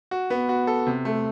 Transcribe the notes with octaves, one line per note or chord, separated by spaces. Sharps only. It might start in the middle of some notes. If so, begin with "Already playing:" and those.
F#4
B3
F#4
A4
C3
A3